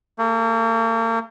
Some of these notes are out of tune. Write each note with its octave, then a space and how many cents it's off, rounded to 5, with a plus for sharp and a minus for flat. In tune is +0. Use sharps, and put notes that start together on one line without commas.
A#3 -40 G#4 +25